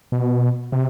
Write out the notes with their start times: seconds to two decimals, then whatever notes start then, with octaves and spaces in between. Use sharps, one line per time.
0.12 B2
0.72 C3